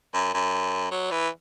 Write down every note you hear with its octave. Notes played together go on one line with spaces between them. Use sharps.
F#2
F#2
F#3
E3